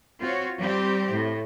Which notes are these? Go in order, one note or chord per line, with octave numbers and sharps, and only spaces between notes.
C4 F4 F#4 C#5
G3 C4 G4
A2